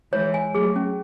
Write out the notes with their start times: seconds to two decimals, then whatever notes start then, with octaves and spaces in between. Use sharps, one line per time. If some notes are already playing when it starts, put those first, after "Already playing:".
0.13 E3 G#3 C#5
0.34 G#5
0.54 F#3 A3 G#4
0.76 C#4